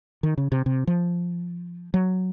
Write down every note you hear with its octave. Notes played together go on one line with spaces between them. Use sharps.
D#3
C#3
C3
C3
F3
F#3